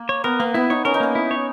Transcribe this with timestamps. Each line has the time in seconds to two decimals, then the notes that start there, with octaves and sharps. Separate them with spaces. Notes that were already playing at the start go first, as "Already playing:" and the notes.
Already playing: A#3
0.09 C#5
0.24 B3 A#4
0.40 A#3 B3
0.54 B3 E4
0.70 D#4 C#5
0.85 C#4 A#4
0.94 D#4
1.00 A#3 C#4
1.15 E4
1.31 C#5